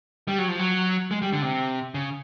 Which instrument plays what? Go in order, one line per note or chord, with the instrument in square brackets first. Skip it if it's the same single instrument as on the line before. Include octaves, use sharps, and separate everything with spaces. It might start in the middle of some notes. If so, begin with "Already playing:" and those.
[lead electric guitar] G3
F#3
F3
F#3
G#3
G3
D3
C3
C#3